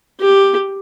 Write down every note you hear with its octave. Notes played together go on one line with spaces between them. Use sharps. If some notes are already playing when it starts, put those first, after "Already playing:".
G4